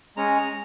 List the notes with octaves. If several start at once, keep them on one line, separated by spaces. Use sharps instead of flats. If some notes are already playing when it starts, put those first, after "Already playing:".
G#3 C#4 A#5